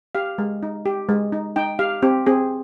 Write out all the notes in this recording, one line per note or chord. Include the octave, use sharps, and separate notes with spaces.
G4 F5
G#3
D#4
G4
G#3
D#4
D#4 G5
G4 F5
C4 G4
C4 G#4